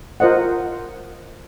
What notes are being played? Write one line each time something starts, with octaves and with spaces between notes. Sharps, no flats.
F4 A#4 C5 D#5 F#5